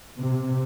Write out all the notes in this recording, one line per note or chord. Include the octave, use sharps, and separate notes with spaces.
C3